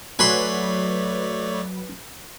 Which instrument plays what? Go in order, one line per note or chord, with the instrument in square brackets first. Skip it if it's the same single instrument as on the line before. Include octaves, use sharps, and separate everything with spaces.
[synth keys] F#3 B4 [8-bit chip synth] A3 C#5 D5 [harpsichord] G#5 B5 C6